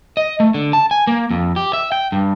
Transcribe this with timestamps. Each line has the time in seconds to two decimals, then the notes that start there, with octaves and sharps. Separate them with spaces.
0.17 D#5
0.40 A3
0.54 D3
0.73 A5
0.91 G#5
1.07 A#3
1.31 F2
1.56 G4
1.73 E5
1.92 G5
2.12 G2